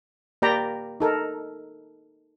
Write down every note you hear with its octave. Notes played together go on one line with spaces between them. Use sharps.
A#3 G4 D5 G5 A#5 B5
D#4 A4 A#4